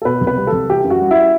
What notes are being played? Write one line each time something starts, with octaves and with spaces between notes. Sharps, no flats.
A4
B2 B4
C2
B4
G3
A4
C2
E3 G4
F#2
F#4
G3
E4